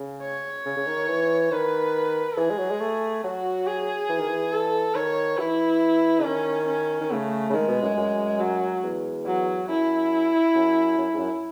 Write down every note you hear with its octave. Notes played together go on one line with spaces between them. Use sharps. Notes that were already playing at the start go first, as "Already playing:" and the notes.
Already playing: C#3
C#5
C#3
C#3
D#3
E3
D#3 B4
E3 G#4
G#3
F#3
G#3
A3
F#3 F#4
G#4
E3
D#3
E3
A4
D#3 C#5
E3 E4
C#3
D#3 C#4
C#4
D#3
C#3 A3
C#3
D#3 G#3
B2
F#2
F#2
F#3
E2
F#3
F#2 E4
F#2
F#2
G#2
F#2